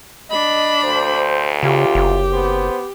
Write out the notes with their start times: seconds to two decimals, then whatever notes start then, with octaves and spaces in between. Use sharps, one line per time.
0.30 D4 D#5 B5
0.85 D2 C5
1.63 C#3 F4 G4
1.95 F#1
2.33 B3 C5